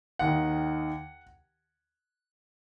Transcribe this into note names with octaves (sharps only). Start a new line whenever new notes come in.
D#2 F#5
D#3